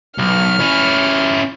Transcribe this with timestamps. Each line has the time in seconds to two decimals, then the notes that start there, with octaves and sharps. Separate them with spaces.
0.18 B1 C#6 F6
0.59 C#4 E4